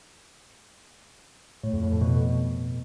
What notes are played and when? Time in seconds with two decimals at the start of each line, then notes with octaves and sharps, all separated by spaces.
1.63 A2
1.73 F2
1.82 A2
1.92 F2
2.01 B2